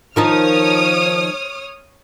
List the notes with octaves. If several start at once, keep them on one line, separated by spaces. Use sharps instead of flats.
D#3 F3 D#4 C#5 D#6 F6